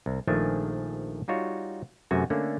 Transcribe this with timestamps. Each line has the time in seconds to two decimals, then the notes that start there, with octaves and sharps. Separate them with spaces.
0.06 C2
0.27 A#1 D#3 F3 A3 D4 G#5
1.28 G3 D#4 F4 F#4 C#5
2.11 F#2 C3 A3 F#4 G#5
2.30 D3 A3 A#3 C#4 D4